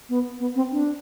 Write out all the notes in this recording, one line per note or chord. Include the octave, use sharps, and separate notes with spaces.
B3
B3
C4
D4